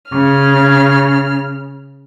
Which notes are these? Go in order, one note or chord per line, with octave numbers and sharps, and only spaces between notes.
C#3 F6